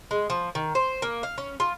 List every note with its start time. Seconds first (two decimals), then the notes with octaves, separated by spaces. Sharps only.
0.11 G#3
0.30 F3
0.55 D#3
0.75 C5
1.02 A#3
1.23 F5
1.38 C#4
1.60 F4